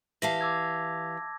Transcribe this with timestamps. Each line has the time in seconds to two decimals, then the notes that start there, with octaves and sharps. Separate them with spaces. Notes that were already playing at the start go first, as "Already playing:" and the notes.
0.22 E3 G4 F5 A5 A#6
0.41 D6 E6 G#6